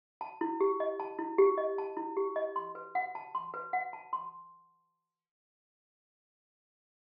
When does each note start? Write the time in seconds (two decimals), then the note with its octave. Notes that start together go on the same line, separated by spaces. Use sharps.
0.21 A5
0.41 E4
0.60 G4
0.80 D#5
1.00 A5
1.19 E4
1.38 G4
1.58 D#5
1.78 A5
1.97 E4
2.17 G4
2.36 D#5
2.56 C6
2.75 B4
2.95 F#5
3.15 A5
3.35 C6
3.54 B4
3.73 F#5
3.93 A5
4.13 C6